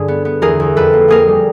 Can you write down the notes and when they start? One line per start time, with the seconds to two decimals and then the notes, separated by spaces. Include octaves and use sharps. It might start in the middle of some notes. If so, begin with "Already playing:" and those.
Already playing: G2 D3 G#4
0.08 B3
0.25 B3
0.42 E2 G#4 A#4
0.60 E2
0.76 F2 A4 B4
0.93 A#3
1.08 A#3 G#4 A#4
1.28 G3